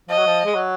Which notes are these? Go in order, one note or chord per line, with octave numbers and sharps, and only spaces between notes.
F3 D#5
F#3
F3
G#3
F#3